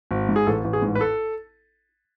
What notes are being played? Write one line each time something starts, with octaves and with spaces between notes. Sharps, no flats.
G#1
G#2
G#4
A1 A4
A1
G#4
G#2
B4
A4